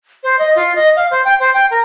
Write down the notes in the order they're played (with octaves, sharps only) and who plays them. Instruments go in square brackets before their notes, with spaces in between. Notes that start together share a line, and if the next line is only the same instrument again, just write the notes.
[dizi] C5
D#5
F4
D#5
F5
C5
G5
C5
G5
A#4